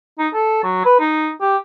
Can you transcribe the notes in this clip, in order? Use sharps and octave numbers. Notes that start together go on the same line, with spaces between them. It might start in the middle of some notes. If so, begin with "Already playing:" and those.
D#4
A4
F#3
B4
D#4
G4